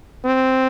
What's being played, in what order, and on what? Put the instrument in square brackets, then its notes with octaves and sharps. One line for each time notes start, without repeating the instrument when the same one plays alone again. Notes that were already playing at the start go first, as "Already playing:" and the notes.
[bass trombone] C4